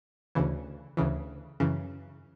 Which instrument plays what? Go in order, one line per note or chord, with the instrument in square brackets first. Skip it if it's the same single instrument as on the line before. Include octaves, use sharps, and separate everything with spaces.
[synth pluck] D2 C#3 E3
D2 C#3 E3
F#2 C#3 E3